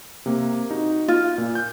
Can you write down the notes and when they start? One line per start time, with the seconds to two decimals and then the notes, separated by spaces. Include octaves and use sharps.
0.26 C3 A#3
0.71 D#4 F#4
1.08 F4
1.38 A#2
1.55 G6